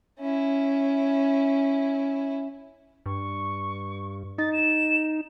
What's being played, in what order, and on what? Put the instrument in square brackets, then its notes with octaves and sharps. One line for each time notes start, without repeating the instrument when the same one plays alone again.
[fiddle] C#4 E4
[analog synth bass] G2 [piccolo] C#6
[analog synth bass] D#4 [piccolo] A6
[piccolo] E7